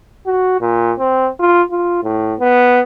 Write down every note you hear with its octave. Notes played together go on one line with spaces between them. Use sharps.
F#4
A#2
C4
F4
F4
A2
B3